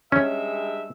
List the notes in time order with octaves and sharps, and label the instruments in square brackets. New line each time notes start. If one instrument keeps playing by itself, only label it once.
[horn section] G2 G#3 E5 [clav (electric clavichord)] C#4